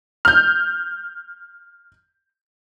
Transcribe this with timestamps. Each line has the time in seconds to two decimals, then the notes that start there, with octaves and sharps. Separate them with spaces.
0.25 F6 G6